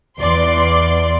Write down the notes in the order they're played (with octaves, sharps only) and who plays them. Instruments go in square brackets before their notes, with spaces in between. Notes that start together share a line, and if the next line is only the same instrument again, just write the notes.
[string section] E2 D5 C6